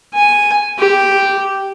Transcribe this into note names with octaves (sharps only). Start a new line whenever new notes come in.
G#5
G4